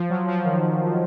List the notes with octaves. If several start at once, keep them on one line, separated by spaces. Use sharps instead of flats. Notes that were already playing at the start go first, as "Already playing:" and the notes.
Already playing: F3
F#3
F3
D#3